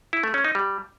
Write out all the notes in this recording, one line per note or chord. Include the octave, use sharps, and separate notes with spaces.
E4
A3
C#4
D#4
G3